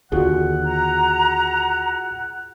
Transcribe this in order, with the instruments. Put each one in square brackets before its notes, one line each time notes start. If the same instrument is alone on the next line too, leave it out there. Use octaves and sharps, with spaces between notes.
[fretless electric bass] D#2 D3 [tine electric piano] F4 F#4 G#4 [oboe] F#5
[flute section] A#5